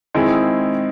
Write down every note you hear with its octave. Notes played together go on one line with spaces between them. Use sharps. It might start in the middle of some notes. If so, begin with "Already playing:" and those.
D#3 G#3 C4 E4 G#4